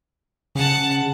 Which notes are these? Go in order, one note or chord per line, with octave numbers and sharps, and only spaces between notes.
C#3 F#5 A5